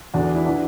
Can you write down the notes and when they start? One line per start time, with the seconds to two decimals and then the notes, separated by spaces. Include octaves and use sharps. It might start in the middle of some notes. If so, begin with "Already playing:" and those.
0.14 E2 D3 D4 F#4
0.35 E4
0.46 E3 D4 F#4